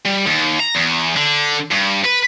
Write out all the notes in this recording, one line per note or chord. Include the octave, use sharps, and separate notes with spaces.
G3
D#2
A#5
E2
D3
G2
B4